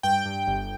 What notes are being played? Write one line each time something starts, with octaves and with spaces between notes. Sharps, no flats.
G2 G5
G2
G1